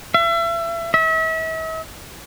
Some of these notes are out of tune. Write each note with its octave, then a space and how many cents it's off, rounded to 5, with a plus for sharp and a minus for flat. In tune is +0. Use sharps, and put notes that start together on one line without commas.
E5 +35
E5 -40